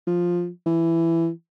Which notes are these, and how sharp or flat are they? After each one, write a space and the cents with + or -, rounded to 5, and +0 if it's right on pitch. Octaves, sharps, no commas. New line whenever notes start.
F3 +5
E3 +10